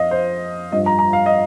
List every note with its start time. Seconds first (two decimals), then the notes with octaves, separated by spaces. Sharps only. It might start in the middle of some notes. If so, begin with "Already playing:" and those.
Already playing: F2 D#5 F5
0.11 C5
0.72 G2 F3 D#5
0.86 A#5
0.99 A#5
1.13 F5
1.26 D#5